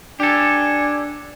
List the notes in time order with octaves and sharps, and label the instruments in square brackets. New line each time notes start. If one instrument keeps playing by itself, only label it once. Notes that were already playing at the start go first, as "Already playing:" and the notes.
[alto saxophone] D4 [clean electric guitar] G4 A4 [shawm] G#5